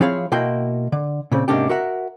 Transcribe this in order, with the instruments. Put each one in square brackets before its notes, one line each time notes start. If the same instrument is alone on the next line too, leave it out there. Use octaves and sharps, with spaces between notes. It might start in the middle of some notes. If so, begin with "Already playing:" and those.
[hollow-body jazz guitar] F3 C4 E4 G#4 C#5 F5
B2 A#3 E4 F#4 G5 C6
D3
A#2 C#3 C4
G#2 C3 A#3 C#4 D4 G4
F#4 A#4 E5 F#5